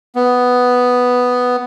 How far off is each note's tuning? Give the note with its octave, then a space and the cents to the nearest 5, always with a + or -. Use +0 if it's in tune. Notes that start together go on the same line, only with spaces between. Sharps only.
B3 +5